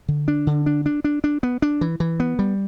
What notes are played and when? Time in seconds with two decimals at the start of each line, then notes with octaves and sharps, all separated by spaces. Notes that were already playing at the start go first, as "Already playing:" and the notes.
0.08 D3
0.28 D4
0.47 D3
0.66 D4
0.86 D4
1.04 D4
1.24 D4
1.43 B3
1.62 D4
1.81 E3
2.00 E3
2.20 B3
2.39 G3